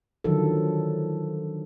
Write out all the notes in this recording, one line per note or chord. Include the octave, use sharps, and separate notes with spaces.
D3 D#3 F3 F#3 A4